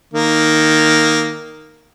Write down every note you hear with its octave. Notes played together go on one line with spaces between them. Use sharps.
D#3 A#3